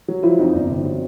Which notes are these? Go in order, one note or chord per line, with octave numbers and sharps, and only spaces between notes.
F#3
F3 E4
F2 D#4
G1 D4
D3 C4
F#3